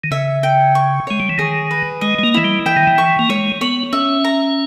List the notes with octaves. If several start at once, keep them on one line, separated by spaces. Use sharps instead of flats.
D#3
C#3 E5
G5
C#6
G#3 C#5
G3
E3
D#3 G#4
B4
G#3 D#5
G#3
A#3
E3 E4
G3
E3 G5
D#3
E3
C#6
A#3
G#3 C#5
B3 C#5
C#4 E5
A#5